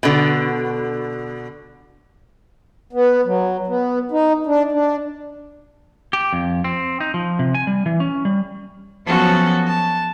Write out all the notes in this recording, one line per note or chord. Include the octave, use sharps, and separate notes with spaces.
B2 D3
B3
F#3
B3
D#4
D4
D4
G4
F2
C4
D#4
F3
C3
G#5
G3
E3
C#4
G3
F3 F#3 B3 C#4 F#4 A4
A5